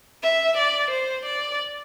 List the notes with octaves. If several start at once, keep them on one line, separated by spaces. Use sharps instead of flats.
E5
D5
C5
D5